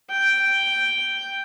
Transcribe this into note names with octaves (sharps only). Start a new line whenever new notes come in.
G5